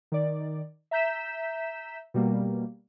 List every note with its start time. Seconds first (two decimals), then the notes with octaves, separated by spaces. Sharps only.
0.12 D#3 D5
0.91 E5 A#5 G6 B6 E7
2.14 B2 G3 A#3